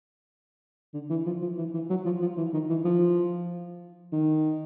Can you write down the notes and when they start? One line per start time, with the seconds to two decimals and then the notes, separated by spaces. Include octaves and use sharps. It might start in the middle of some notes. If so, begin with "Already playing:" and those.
0.94 D3
1.10 E3
1.26 F3
1.42 F3
1.58 E3
1.74 E3
1.90 F#3
2.05 F3
2.21 F3
2.37 E3
2.53 D#3
2.70 E3
2.85 F3
4.13 D#3